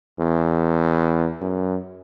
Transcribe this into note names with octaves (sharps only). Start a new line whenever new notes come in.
E2
F#2